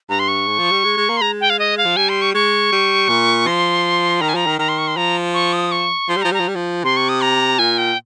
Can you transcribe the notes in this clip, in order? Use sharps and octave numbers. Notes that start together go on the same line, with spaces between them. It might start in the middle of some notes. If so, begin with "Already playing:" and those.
G2 A#5
C6
C#6
G#2
F3
G3
G#3
G#3
A#3
C6
G#3 A#5
G5
F5
D#5
F5
F3
G3 G#5
C6
C#6
G#3 C#6
G3
A#2
F3 C6
D#3 A#5
G#5
F3 A#5
D#3
D#3 A#5
C6
C#6
C6
F3 A#5
C#6
D#6
C#6
F3 C6
G3
F3 A#5
G3 A#5
F3
G3
F3
C3 C6
C#6
D#6
A#5
A#2 G#5
G5